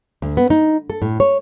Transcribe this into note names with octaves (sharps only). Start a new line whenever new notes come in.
D2
B3
D#4
A4
A2
C#5